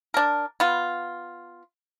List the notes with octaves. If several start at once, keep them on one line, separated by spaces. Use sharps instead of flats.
D4 A#4
B3 F4